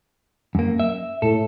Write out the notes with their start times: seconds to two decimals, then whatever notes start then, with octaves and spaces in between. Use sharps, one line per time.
0.55 F#2 A#3
0.80 E5
1.22 A2 A4